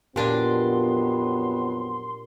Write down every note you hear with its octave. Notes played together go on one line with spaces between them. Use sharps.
F2 A#2 F#3 B3 D4 G4 G#5 C6